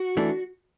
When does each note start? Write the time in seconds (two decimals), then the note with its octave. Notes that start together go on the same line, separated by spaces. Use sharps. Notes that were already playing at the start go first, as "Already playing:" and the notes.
Already playing: F#4
0.17 E3 A3 D4